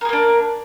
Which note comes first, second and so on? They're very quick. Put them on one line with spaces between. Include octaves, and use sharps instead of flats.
A#4 G#4 A#3 D4